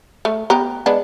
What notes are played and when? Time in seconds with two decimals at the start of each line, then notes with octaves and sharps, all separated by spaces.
0.25 A3
0.50 B3 G4 A#5
0.86 G#3 B3 D4